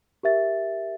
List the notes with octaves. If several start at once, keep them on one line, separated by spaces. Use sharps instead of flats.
G4 A#4 E5 A6